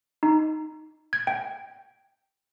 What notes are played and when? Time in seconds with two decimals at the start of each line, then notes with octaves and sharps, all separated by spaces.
0.23 D#4
1.13 G#6
1.27 G5